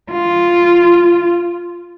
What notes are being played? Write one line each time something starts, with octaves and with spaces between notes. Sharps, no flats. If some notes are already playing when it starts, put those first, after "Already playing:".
F4